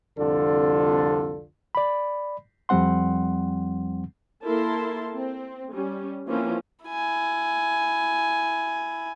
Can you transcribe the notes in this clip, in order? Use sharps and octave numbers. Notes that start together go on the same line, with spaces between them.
C2 F2 D3 D4 F4 A4
D5 B5
F2 F3 G3 C4 F#5 C6
A#3 E4 A4 A#4 A5 C6
C4
G3 C#4
E3 F3 A#3 C4 C#4 F4
E4 G#5